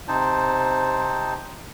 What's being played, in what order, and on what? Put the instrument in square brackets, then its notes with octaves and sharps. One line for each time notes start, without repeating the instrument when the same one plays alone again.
[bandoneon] C3 C4 D#4 C5 A5